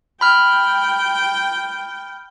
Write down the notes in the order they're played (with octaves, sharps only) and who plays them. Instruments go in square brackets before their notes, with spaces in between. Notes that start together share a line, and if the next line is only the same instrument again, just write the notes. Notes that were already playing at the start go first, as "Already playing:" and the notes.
[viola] G5 [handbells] B5 F6